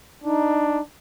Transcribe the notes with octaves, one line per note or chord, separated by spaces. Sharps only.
D4 D#4